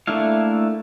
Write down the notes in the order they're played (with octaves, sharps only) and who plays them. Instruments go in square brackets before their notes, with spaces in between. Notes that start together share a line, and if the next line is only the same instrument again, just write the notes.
[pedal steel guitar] A3 A#3 D4 E4 F5